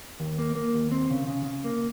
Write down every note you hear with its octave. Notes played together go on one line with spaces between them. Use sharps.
D#2
A#3
A#3
D#2
C4
C#3
C#3
C#3
A#3